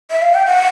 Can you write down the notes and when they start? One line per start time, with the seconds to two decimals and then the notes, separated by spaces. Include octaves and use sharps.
0.11 E5
0.22 F5
0.35 G5
0.46 F#5